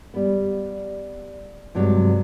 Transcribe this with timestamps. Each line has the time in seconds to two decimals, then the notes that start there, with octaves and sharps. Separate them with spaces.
0.14 G3 B3
1.75 G2 C3 F#3 G#3